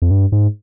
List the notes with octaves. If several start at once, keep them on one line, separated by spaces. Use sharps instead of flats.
F2
G2
G#2